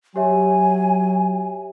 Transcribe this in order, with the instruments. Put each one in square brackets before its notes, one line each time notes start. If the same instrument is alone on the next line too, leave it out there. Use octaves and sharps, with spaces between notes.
[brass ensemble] F#3 [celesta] G4 C#5 E5 [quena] G#5